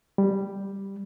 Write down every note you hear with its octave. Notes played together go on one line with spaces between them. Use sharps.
G3